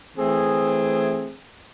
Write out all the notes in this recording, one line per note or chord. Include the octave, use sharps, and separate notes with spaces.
E3 A3 C4 G#4